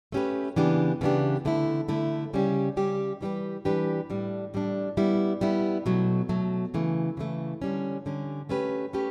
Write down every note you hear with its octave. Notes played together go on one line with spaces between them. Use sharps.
A3 C#4 G4 B4
C#3 E3 B3 D4 G4
C#3 E3 B3 D4 G4
D3 A3 E4
D3 A3 E4
C#3 G3 C#4 G4
C#3 G3 C#4 G4
E3 G3 D4 G4 B4
E3 G3 D4 G4 B4
A2 G3 D4
A2 G3 D4
G3 B3 E4
G3 B3 E4
B2 F#3 A3
B2 F#3 A3
C#3 E3 A3
C#3 E3 A3
D3 G3 C#4
D3 G3 C#4
A3 C#4 G4 B4
A3 C#4 G4 B4